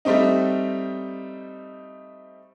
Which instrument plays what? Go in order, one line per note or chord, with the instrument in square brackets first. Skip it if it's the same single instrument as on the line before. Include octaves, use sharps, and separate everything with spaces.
[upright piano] G3 A3 C4 D#4